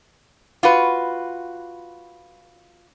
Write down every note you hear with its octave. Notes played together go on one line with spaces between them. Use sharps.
F4 F#4 B4